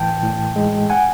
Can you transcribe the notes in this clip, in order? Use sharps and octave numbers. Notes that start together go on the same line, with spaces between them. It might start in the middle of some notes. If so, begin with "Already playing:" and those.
Already playing: A2 E3 G5 A5
A2
G#3
F#5 G#5